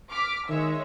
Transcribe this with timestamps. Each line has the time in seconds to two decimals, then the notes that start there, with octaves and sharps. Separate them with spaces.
0.11 D6 F6 B6
0.49 D#3 G#3 C#5 E5